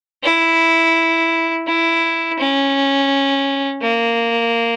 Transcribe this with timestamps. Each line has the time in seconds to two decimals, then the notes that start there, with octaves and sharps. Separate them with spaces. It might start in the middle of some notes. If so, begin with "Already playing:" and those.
0.23 E4
1.67 E4
2.39 C#4
3.82 A#3